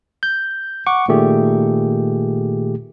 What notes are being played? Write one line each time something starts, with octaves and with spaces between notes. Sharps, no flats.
G6
F#5 C#6 D6
A#2 D#3 A3 G4 G#4